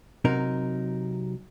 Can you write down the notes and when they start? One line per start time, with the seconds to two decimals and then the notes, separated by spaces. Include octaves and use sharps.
0.25 C3 F#3 D#4 A#4